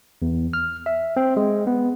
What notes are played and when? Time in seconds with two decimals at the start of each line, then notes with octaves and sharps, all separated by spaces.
0.22 E2
0.53 F6
0.86 E5
1.17 C4
1.37 G#3
1.67 B3